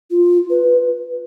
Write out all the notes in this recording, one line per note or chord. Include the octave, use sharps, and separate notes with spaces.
F4
B4